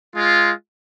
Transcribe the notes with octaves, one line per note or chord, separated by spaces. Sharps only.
G#3 F4